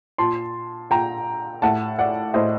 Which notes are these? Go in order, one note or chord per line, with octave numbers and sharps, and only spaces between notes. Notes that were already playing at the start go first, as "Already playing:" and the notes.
A#2 A5 C6
A#2 G5 A#5
A2 F#5 A5
D5 F#5
A2 C5 D#5